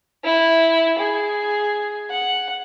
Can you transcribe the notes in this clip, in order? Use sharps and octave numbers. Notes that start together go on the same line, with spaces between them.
E4
G#4
F#5